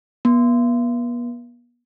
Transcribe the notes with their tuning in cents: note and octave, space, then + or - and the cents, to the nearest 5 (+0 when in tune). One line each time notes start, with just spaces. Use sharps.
B3 -40